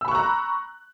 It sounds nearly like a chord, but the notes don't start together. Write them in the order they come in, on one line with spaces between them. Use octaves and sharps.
E6 B5 C#6 F#6 A#5